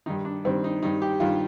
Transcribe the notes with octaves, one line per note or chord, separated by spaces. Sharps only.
G2 D#3 D#4
D4
G2 D#3 C4
D#4
G2 D#3 D#4
G4
G2 D#3 F4